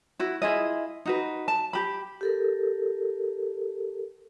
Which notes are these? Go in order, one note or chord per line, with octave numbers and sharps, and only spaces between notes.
E4 F#4
E4 F4 G#4 D#5
D#4 F#4 B4
A5
G4 B5
G4 A4 A#4